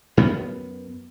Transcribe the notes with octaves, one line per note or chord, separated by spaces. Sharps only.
F#2 B3